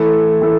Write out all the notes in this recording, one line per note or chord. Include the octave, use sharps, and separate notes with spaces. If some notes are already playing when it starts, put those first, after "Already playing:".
Already playing: E3 A3 E4 A4
E3 A3 E4 A4